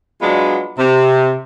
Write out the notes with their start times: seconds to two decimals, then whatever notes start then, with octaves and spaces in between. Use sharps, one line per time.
0.22 F#3 G#3 B3 D4 F4
0.79 C3